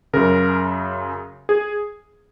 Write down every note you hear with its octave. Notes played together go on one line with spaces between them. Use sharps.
F#2 C#3 A#4
G#4